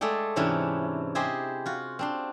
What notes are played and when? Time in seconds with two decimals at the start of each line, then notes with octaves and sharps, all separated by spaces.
0.01 G#3 A3 G#4 A4 D5 G5
0.36 G#2 C3 E3 C#4 D4 E4
1.15 E4 G4 G#4 C5 D#5
1.66 F4 F#4
1.99 C4 D4 C6